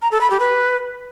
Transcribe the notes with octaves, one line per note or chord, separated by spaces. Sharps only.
A#5
A4
B5
G4
B4